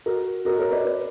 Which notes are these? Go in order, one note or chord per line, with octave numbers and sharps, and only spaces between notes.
F#4 A#4
F#4 A#4
A#4 C#5
B4 D5
B4 D5